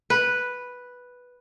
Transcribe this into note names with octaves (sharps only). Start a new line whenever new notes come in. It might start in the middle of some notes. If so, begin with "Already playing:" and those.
B4